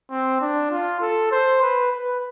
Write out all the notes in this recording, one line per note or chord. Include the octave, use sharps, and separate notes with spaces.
C4
D4
F4
A4
C5
B4
B4